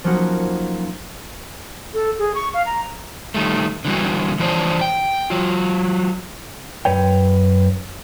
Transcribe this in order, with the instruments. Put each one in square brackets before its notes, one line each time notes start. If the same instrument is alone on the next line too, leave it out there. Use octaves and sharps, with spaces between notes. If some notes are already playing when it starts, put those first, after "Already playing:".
[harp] F3 F#3 A#3 C#4 D#4 F#4
[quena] A4
G#4
C#6
F5
A#5
[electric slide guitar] D#3 G3 A3
D3 E3 G3 F#4
E3 F3 D4 C5 C#5
G5
F#3 F4
F#2 B4 C#5 G5